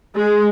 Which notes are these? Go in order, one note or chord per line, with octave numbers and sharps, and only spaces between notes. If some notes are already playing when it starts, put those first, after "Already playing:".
G#3